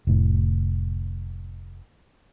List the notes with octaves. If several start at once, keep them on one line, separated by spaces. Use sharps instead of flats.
F1 A2